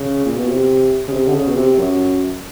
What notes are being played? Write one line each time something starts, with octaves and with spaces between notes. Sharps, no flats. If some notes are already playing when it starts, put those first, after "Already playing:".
Already playing: C#3
A#2
B2
C3
C#3
C3
D3
C#3
B2
C3
F#2